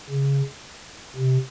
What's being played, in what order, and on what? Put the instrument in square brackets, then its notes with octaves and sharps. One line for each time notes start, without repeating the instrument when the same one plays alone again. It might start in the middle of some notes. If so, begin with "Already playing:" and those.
[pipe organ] C#3
C3